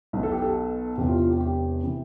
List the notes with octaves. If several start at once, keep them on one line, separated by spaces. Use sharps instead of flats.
B1 B2
A4
G4
A4
E1 E2 C3 E3 G4
F4
F4
G4
G4
C3 E3